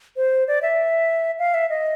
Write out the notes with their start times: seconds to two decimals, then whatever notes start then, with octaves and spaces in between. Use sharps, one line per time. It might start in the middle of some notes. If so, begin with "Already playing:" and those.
0.17 C5
0.48 D5
0.62 E5
1.39 F5
1.54 E5
1.70 D#5